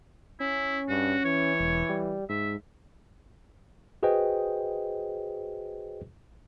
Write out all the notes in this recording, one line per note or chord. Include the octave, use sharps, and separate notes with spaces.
C#4 E4
G2 F#4
E3 C#5
E1
G3
G#2 E5
F#4 G#4 B4 C5 D#5 G5